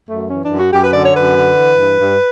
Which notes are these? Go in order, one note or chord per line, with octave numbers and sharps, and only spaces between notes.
F#2 A3
E3 C#4
D4
F#2
F#4
F#2 G4
B4
D3 D5
C#5
F#2 B4
D3
E3
G2
G2